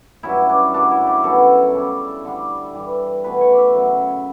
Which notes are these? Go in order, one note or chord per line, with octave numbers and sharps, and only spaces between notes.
G2 F#3 C#4 E4
D4
F#2 C#3 F#3 D4
E4
G4
B2 F#3 C#4 A4
C#3 G3 D4
D3 G3 D4
G2 E3 G3
B2 A3 C#4 B4
C#5
D5
E5
F#2 C#3 F#3